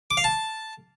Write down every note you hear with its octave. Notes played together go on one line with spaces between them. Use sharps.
D6
F5
A5